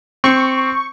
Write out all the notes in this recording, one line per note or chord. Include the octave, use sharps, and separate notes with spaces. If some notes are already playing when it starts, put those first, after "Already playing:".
C4 C#6